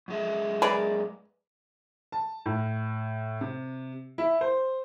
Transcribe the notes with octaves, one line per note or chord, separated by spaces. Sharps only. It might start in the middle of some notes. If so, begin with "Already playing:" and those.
F#2 G#3 E5
G#4 A#4 B4 D5
A5
A2
C3
E4
C5